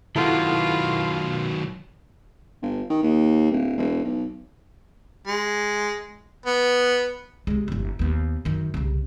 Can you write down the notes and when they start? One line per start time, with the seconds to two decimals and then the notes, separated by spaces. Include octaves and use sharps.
0.16 B2 D#3 F#3 E4 F4 A4 F#5
2.62 G1
2.90 D#3
3.03 D#2
3.51 D1
3.77 E1
4.04 B1
5.27 G#3
6.46 B3
7.47 C3 G#3
7.68 G1 E2
7.99 D#2 B3
8.45 F#2 D#3
8.74 C2 C#3